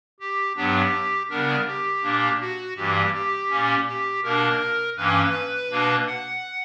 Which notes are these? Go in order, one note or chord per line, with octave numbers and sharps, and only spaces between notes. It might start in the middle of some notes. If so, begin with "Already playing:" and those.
G4
G2 F#3 B3 D4 G4
C#3 G3 B3 D4 A#4
G4
A#2 A#3 D4
F#4
G2 E3 G3 A#3 G4
G4
A#2 A#3 C#4
G4
B2 A#3 D4 A#4
G2 E3 A#3 C#4 B4
B2 A#3 D4
F#5